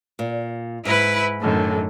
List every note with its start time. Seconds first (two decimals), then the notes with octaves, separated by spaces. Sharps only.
0.19 A#2
0.85 G#2 E4 B4
1.41 F#2 A2 D3 D#3